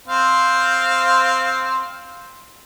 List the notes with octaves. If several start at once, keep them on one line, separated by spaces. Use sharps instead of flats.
C4 C5 F5